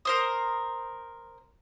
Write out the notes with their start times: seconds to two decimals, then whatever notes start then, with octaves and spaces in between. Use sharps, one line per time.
0.05 A#4 C5 D#6